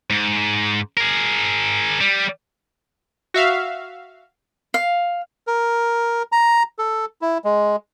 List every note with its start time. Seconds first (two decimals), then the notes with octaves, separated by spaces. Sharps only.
0.10 G#2
0.97 G#4 A#4
2.01 G3
3.34 F#4 E5 F5
4.74 F5
5.47 A#4
6.32 A#5
6.79 A4
7.22 E4
7.44 G#3